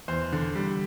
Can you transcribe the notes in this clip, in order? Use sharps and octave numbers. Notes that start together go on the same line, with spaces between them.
E2 C5
D3
G3